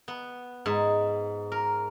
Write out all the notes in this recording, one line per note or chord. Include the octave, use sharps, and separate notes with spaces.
B3
G#2
A#4